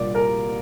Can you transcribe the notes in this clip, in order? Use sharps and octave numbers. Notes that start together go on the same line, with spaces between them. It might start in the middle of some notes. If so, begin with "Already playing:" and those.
Already playing: C2 A#2 A#3 D4 F4 D5
A#4